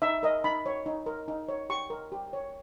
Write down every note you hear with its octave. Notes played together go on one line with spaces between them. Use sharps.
D#4 E5
A#4 D#5
D#4 B5
C#5
D#4
A#4
D#4
C#5
G4 C#6
A#4
G4
C#5